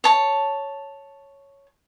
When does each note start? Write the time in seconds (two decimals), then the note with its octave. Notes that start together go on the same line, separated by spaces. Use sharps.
0.04 C#5 A5